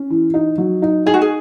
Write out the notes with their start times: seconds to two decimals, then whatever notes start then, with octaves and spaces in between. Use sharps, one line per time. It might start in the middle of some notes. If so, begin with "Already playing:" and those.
Already playing: C#4
0.10 E3
0.34 D#4
0.58 F#3
0.82 D#4
1.06 D#4 G#4
1.14 F#4
1.22 G#4